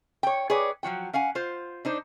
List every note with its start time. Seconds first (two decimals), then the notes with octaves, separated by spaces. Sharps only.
0.23 C#5 G5
0.50 G#4 B4 C#5 D5
0.83 F3 F#3 F#4 G5
1.13 C#4 F5 F#5 G#5
1.35 F4 C5
1.85 D4 D#4 C5